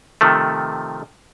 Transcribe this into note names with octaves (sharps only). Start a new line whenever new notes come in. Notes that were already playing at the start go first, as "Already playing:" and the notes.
C3 D#3 F3 A3